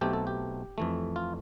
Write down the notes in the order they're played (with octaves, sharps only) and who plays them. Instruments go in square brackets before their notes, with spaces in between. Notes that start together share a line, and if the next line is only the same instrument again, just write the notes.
[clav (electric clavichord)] B1 B2 A3 C4 G4
A4
G4
F2 E3 A3
F4